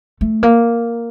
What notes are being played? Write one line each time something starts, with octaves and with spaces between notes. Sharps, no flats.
A3
A#3